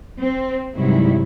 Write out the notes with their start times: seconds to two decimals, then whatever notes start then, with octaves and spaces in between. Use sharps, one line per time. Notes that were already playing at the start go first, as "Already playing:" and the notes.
0.20 C4
0.76 G2 C3 D#3 F#3 G#3 E4